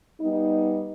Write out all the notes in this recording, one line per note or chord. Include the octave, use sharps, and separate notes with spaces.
G3 B3 D#4